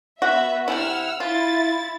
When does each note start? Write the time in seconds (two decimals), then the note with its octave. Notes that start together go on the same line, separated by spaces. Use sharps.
0.22 B3 F#4 E5
0.68 C3 D#3 E4 F#5 E6 F6
1.20 E4 F4 A6